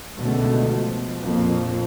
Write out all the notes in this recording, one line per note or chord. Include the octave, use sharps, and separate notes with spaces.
C#2 B2 D3 A3
B2 F3
A#1 F2 F3 A#3